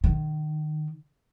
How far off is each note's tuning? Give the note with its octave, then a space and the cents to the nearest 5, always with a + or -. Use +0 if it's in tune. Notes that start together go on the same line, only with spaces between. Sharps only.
D#3 -25